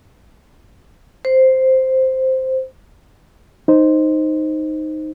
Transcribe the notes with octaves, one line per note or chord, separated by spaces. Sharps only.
C5
D#4 C5